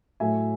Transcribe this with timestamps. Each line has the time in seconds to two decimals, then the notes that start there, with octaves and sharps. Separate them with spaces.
0.20 A2 F#3 A3 E5 G#5